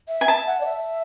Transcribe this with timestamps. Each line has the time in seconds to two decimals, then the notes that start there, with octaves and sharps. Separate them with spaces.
0.08 E5
0.21 G#5
0.27 E5 A5
0.47 F#5
0.61 D5
0.66 E5